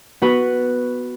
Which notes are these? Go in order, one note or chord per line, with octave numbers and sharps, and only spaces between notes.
B3 F#4 B4